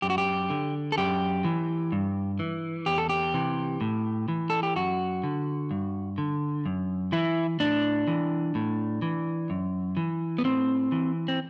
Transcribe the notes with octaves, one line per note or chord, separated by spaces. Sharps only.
F#2 G4
F#4
G4
D3
A4
F#2 G4
E3
G2
E3
E2 G4
A4
G4
C3 E3
A2
E3
A4
G4
F#2 F#4
D3
G2
D3
F#2
E3 E4
A2 D4
E3
A2
E3
F#2
E3
B3
A2 C4
E3
C4